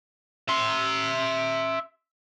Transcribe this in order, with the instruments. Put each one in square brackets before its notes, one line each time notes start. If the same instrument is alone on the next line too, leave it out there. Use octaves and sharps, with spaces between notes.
[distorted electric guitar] E5 C6